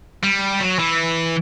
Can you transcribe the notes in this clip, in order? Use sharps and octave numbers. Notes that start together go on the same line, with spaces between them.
G3
F#3
E3